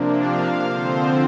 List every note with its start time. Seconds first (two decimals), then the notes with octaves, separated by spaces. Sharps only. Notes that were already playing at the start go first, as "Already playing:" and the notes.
Already playing: C3 F3 A#3 D4
0.19 F5
0.62 D3 F3 C4 C5